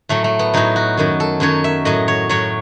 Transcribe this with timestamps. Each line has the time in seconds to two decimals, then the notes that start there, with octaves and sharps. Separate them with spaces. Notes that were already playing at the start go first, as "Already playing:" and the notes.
0.09 A2 F#3 A3
0.24 A3
0.39 B3
0.54 A2 F#3 D#4
0.76 F#4
0.97 F#2 D#3 F#3
1.20 A4
1.40 F#2 D#3 F#3 C#5
1.64 E5
1.85 A2 F#3 D#5
2.08 C#5
2.29 A2 F#3 C#5